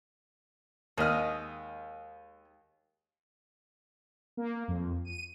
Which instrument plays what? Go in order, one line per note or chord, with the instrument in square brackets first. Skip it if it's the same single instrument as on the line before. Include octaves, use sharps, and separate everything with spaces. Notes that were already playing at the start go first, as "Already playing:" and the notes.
[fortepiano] D#2 F6 [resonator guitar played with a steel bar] G#3 D#5
[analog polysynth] A#3
F2
D#7